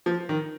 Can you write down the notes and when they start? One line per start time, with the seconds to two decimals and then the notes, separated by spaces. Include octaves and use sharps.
0.06 F3
0.29 D#3